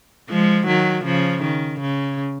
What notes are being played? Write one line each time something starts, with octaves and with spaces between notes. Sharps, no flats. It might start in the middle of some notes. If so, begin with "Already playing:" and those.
F3 G#3
D#3 F#3
C#3 F3
D#3
C#3